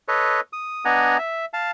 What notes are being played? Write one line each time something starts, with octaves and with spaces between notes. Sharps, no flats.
A4 B4 C#5 D#5
D#6
B3 D4 D#5 F#5 G#5 A#5
E5
F5 A5